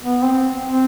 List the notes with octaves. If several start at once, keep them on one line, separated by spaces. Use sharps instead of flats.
B3
C4
C4